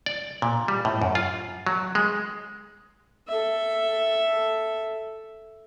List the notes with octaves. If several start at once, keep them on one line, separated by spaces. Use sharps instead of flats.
D5
A#2
G3
A2
F#2
F4
F#3
G#3
A4 E5